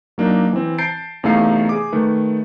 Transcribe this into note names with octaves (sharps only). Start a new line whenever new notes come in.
F#3 A#3 D4 D#4
E3 C4
A5 G6 A6 C7 D7
E2 C3 A3 D#4 F5 C7
G#4 D6
D#3 A3 B4